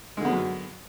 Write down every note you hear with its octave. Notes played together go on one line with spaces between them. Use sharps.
F#2 D3 F#3 G#3 B3